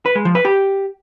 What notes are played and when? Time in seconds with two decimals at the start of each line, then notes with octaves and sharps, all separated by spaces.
0.06 B4
0.15 G#3
0.25 F3
0.35 B4
0.45 G4